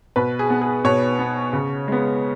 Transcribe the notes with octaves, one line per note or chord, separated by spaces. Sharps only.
B2 B4
G#4
B3
G#4
B2 C#5
B3
C#3
G#3 B3